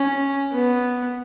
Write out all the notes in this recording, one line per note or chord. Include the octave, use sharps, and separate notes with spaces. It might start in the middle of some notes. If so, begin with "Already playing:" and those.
Already playing: C#4
B3